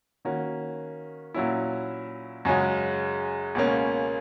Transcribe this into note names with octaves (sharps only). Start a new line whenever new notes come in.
D#3 A#3 C#4 F#4
A#2 F#3 C#4 E4
F#2 C#3 G#3 C#4 F#4
C#2 B2 A#3 C#4